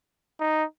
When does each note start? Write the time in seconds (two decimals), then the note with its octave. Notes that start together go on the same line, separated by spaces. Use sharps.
0.40 D#4